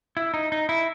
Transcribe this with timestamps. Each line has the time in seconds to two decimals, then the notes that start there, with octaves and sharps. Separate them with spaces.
0.17 E4
0.34 D#4
0.52 D#4
0.69 E4